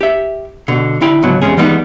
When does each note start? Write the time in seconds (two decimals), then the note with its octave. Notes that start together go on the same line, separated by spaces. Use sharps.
0.01 G4 E5
0.68 B2 D3
1.01 D3 E4 G5
1.23 C#2 G#2 D3 F#3 B3
1.41 E2 G#2 C3 G#3 C#4 G#4
1.57 E3 G3 G#3 B3 C4 D#4